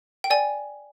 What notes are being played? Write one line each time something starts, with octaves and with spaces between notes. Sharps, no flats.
G5
D5 G#5